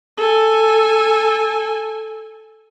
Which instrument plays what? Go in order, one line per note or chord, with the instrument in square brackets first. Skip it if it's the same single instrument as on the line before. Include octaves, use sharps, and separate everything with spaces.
[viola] A4 G#5